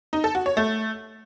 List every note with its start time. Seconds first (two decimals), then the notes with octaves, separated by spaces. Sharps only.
0.13 D#4
0.24 A4
0.35 F#4
0.46 C#5
0.57 A3